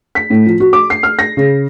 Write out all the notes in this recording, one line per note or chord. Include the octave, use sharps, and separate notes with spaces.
B6
A2
F3
F#4
D6
C7
F6
A#6
C#3